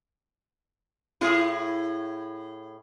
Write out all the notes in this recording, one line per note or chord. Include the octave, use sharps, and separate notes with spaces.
A2 E4 G#4